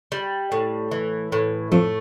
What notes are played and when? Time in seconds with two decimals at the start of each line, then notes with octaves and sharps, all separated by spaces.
0.12 G3
0.52 A2
0.91 E3
1.32 A2
1.72 F2 F3 A3